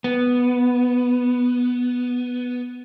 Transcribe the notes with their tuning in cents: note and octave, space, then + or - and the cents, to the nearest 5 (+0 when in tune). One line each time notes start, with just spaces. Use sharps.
B3 +0